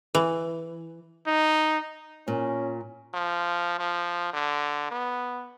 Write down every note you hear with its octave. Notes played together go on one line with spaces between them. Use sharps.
E3
D#4
A#2 C#4
F3
F3
D3
B3